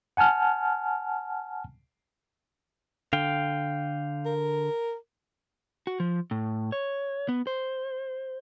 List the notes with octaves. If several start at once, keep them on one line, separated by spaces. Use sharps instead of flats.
F#5 G#5 A5 F6
D3 F5 G5
A#4
F#4
F3
A2
C#5
B3
C5